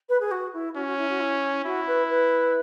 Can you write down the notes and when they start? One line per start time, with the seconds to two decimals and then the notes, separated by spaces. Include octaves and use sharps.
0.09 B4
0.20 G#4
0.31 F#4
0.54 E4
0.76 C#4 F#4
0.86 F#4
0.98 E4
1.09 F#4
1.20 E4
1.65 E4 F#4
1.87 B4
2.09 B4